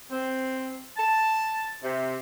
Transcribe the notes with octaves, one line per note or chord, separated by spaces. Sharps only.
C4
A5
C3